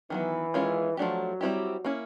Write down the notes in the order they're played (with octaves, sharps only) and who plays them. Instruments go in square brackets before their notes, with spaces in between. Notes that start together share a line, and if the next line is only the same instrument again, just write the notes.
[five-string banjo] D#3 F#3 B3 [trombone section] E3
[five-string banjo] D#3 G#3 C#4 F4
[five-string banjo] F3 A3 D4 G4 [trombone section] F#3
[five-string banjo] G3 C4 E4 G4
A#3 C#4 E4